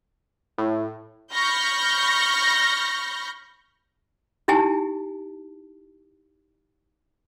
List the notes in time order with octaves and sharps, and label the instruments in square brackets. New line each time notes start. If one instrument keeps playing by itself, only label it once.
[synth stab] A2 [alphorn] E4
[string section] B5 C#6 F6 G6 A#6
[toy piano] D#4 E4 G4 G#5 A5